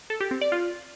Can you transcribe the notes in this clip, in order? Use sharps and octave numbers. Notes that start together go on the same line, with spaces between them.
A4
G4
C4
D5
F4